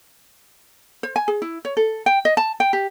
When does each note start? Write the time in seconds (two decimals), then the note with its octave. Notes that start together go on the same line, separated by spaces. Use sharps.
1.03 C5
1.16 G#5
1.28 G#4
1.42 E4
1.65 C#5
1.77 A4
2.06 G5
2.25 D#5
2.37 A5
2.60 G5
2.73 G4